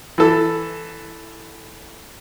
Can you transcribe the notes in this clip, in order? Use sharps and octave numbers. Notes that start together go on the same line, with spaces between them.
E3 A4